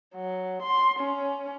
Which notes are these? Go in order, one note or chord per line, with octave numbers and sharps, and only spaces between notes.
F#3
C6
C#4